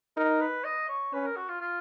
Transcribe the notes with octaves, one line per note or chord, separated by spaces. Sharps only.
D#4 A#4
B4
D#5
C#5
C#4 B4
A#4
F#4
F4
F4